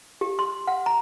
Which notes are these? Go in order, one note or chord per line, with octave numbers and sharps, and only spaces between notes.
G4
C6
F#5
A#5